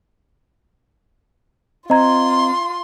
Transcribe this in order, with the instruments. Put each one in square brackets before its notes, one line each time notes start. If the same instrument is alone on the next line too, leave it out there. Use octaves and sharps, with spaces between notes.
[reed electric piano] C4 [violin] F4 C6 [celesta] D#5 A#5 G#6